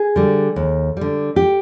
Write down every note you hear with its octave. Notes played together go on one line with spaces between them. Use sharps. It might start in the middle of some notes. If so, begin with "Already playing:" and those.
Already playing: G#4
D3 G3
D#2
D3 G3
G4